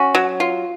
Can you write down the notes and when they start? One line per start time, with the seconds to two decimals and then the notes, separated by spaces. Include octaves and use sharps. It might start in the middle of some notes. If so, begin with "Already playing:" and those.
Already playing: C#4 F#4
0.15 F#3
0.40 F4